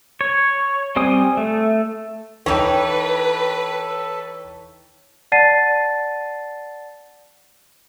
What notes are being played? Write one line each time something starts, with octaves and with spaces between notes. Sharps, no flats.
C#5
G3 C4 G#5 D#6
A3
E3 D#4 A4 B4 C#5 G5
D5 F#5 A5 A6 C7 D#7